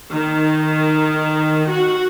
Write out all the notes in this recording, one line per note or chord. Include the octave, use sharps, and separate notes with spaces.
D#3
F#4